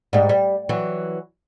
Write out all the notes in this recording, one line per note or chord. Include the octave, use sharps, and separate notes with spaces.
G#2 G3
G3
E3 F#3